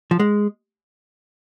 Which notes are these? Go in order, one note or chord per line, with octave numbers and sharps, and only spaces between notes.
F3
G#3